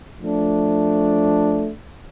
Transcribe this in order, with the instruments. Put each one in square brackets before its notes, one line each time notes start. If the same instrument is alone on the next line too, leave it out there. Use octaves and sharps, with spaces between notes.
[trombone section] F3 A3 D4